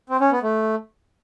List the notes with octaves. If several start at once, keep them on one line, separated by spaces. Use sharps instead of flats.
C4
C#4
B3
A3